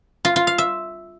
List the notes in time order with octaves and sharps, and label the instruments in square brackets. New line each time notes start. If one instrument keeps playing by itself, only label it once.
[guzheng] F4
F4
F5
E5